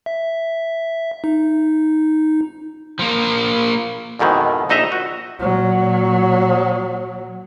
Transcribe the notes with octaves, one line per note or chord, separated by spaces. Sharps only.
E5
D#4
F3 A#3
F2 G#2 B2 D#3 E3
A#1 D#4 D#5 E5 A#5
F#4
A#2 F#3